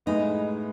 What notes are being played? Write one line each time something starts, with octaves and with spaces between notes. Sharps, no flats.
A2 G#3 B3 D#4